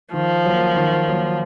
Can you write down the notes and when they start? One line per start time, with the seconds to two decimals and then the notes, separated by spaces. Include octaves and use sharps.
0.14 D#3 F3
0.45 F#3 A#3
0.76 D#3
1.08 F#3 A#3